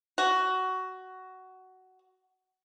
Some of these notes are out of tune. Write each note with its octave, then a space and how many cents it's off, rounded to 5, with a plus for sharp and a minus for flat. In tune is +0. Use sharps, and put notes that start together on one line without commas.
F#4 +15